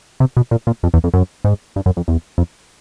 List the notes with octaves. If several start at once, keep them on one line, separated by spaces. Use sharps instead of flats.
C3
B2
A#2
A#2
F2
E2
F2
F#2
G#2
G2
F#2
F2
E2
F2